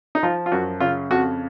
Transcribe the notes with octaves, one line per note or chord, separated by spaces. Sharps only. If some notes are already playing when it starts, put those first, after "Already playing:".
D#4
F3 F4
F4
F#2 F#4
C#3 F4
F2 F#4